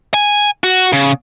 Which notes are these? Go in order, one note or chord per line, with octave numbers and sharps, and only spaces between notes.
G#5
F#4
C#3